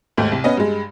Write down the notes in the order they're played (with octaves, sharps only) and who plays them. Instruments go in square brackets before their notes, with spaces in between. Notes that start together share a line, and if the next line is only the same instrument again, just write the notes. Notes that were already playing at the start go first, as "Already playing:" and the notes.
[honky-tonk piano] D#2 G#2 A3
C2
B3 C#4 D#5
G2 G#3